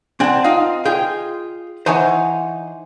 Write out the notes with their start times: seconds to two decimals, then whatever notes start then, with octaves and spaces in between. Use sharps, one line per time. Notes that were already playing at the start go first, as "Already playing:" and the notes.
0.20 C4 D5 F#5 G#5 A5
0.44 D#4 F4 D#5 F5
0.85 F4 G#4 G5
1.86 E3 D#4 C5 C#5 F#5 G#5 A#5